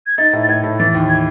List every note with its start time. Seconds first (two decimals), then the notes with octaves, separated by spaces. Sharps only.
0.07 G#6
0.18 D#4 A6
0.33 A2
0.43 A6
0.49 A2 G#6
0.63 A2
0.79 E3 A6
0.94 D#2
1.09 G#6